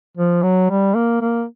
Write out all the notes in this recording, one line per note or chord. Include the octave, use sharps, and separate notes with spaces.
F3
F#3
G3
A#3
A#3